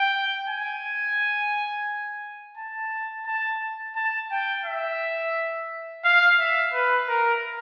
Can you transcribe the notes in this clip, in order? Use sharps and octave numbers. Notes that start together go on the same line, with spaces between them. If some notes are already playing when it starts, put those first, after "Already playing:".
Already playing: G5
G#5
A5
A5
A5
G5
E5
F5
E5
B4
A#4